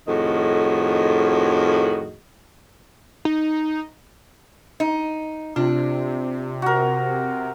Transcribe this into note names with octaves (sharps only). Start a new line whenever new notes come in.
F2 A2 D#3 F#4 G#4 D#5
D#4
D#4
C3 D4 F4
F#4 A#4